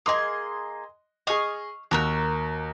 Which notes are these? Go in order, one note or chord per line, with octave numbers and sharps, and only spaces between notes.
A#3 G#4 D#5 C6 D#6
G#4 D#5 C#6 D#6 F6
D#2 F#4 A#4 E6